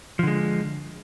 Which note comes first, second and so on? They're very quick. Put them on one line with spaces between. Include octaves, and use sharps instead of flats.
F3 D3 G#3